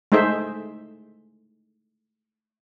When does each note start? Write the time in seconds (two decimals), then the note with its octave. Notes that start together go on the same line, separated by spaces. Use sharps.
0.12 G#3 A3 D#4 G#4 C5 E5